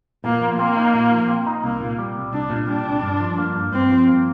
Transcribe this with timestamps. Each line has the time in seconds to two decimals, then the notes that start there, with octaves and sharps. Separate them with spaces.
0.24 A#2 A#3
0.41 F3
0.58 A#3 C4
0.77 D#4
0.94 A#2
1.12 F3
1.28 C4
1.46 D#4
1.64 C2 A#3
1.81 A#2
1.98 G3
2.16 C2
2.33 C2 D4
2.50 A#2
2.68 G3 D4
2.86 C2
3.03 G2
3.20 F3
3.38 A#3
3.55 G2
3.72 G2 C4
3.89 F3
4.07 A#3